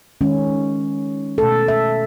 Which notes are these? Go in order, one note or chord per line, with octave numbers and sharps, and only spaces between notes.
D#3 G#3 C#4
B2 A3 A4
E5